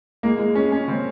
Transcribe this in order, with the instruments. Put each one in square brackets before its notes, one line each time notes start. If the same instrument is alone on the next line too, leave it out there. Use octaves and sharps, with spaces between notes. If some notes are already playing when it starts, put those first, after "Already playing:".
[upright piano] G#3 [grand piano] A#3
[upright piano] G#3
[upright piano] G#3 [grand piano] C#4
[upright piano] G#3 [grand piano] C#4
[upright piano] C#3 [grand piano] C4